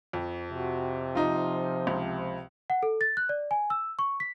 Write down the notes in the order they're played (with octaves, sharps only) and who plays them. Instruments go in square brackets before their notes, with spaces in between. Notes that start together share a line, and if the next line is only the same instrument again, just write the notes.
[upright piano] F2
[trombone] C3 [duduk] F#4
[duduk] F3 [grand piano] D#4 F4
[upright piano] C#2
[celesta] F#5
A4
A6
F#6
D5
G#5
E6
C#6
B6